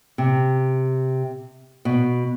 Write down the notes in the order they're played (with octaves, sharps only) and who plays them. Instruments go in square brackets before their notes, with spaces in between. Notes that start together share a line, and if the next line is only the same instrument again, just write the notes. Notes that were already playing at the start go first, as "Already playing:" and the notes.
[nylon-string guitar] C3
B2